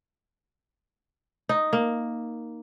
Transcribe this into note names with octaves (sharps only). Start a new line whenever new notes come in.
D#4
A#3